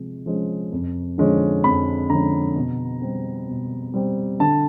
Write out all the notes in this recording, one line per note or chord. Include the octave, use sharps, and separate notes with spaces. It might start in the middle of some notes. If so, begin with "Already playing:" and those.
Already playing: C3 F3 G#3
F3 G#3 C#4
F2
D3 F3 G#3 C#4
F2 B5
D3 F3 G#3 C#4 A#5
B2
G3 C4
B2
G3 C4
D3 A5